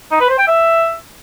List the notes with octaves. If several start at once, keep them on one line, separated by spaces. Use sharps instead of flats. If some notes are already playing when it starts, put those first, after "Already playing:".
D#4
B4
C5
G5
E5